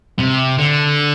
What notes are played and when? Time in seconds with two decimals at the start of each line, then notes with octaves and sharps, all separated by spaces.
0.20 C3
0.59 D3